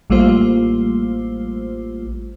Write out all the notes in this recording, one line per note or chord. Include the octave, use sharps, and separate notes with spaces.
A1 G3 A3 A#3 F4 C5